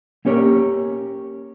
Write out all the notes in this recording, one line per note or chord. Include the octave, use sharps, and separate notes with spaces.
A#3 C#4 G4 A#4 C#5